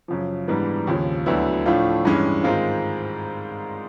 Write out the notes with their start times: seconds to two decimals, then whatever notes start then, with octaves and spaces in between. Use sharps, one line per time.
0.08 F#2 C#3 F3
0.48 G#2 E3 G3 B3 D4
0.87 D#2 C#3 F3
1.26 D2 D3 F#3 B3 E4
1.66 A2 F3 A3 D4 F4
2.05 G2 E3 G#3 C#4
2.44 G#2 D#3 G#3 C4 F4